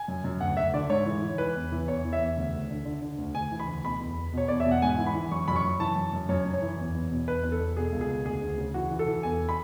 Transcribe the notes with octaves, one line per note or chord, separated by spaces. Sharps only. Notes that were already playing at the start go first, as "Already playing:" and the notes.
Already playing: G#5
F#2
F#2
D2 F#5
D2 E5
D3 D5
G#2 C#5
E3
E3
E3 B4
E2
E3
E2 C#5
E3
E5
E2
D2
D2
D3
D3
D3
D2
D2 G#5
E3
B5
D2
B2 B5
E2
E2
B2 C#5
E2 D5
E5
B2
F#5
G#2 G#5
E3
B5
E3
F#2 C#6
F#2 B5
C#6
F#2
E3 A5
F#2
F#2
F#2 C#5
F#2
C#5
E3
E2
E2
B2
E2 B4
E2
A4
E2
B2 G#4
C#2
G#4
B2
D2 G#4
D2
C#3
E3 F#4
E3
A4
E3
E2 G#5
B5